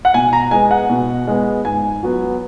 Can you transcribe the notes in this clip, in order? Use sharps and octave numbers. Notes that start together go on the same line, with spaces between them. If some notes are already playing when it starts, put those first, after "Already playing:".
F#5
B2 G#5
A#5
G#3 B3 G#5
F#5
B2
G#3 B3
G#2 G#5
F#3 B3